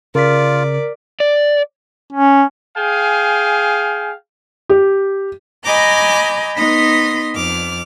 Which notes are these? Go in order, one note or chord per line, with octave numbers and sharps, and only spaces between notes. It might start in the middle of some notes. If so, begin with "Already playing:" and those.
C#3 F4 A#4 D5 B6
D5
C#4
G#4 F5 G5 G#5
G4
D#5 G#5 A#5 B5 D6 G6
B3 D#4 B5 C6 D#6 A#6
F2 D6 F6